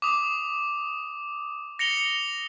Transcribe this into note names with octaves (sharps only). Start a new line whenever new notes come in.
D6 D#6
A#6 C#7 F7 G7